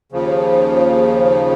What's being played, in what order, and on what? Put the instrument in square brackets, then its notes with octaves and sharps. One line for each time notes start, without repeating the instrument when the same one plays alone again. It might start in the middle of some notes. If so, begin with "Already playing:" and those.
[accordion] D#2 C#3 F3